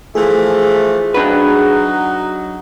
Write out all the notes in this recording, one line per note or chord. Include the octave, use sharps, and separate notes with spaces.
E3 F3 A3 G#4
F#3 D4 D#4 F#4 B4